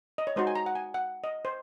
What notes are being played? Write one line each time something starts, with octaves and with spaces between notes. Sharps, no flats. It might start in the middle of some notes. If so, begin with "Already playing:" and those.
D#5
C#5
G#3 D#4 F#4 C5
G#5
A#5
F#5
G#5
F#5
D#5
C5